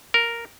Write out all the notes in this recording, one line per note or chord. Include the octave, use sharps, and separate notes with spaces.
A#4